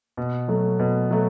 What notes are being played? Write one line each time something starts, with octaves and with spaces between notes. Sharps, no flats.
B2
F#3 A3
B2
F#3 A3